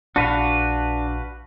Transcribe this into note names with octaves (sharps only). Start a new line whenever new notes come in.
A#1 D4 F#4 B4 F5